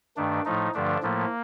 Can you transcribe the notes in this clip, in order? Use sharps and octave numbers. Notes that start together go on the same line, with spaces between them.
G2 D#3 A3 D4
A2 F3 A3 D#4
G2 D3 F3 A3 D4
A2 F3 A3 A#3